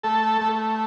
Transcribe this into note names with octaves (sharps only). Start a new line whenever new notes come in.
A3 A4
A3